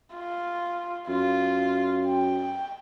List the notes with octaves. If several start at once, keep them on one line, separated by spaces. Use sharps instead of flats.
F4
F#2 F4
G5